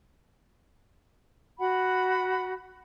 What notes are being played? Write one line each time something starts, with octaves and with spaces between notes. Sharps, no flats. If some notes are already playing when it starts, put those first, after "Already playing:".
F#4 F#5 B5